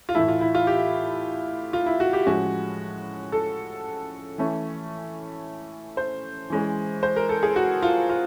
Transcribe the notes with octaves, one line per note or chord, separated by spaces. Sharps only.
F4
A2 E3 A3 E4
F4
E4
F4
G4
F4
E4
F#4
G4
A2 F3 G#3 C#4 F#4
A4
E3 A3 C#4
C5
E3 G#3 C#4
C5
A#4
A4
G#4
F#4
F4
F4